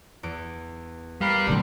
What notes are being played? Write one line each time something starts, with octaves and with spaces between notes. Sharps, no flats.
E2 D7
G3 A#4 B4 F5
A#1 D3 F#3 C4